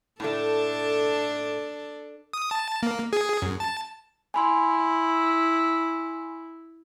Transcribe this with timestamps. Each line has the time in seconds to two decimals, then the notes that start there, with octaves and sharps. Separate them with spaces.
0.20 A2 A3 D4 A4
2.33 D#6
2.51 A5
2.83 A#3
3.13 G#4
3.42 F#2
3.60 A5
4.34 E4 G#5 B5 C6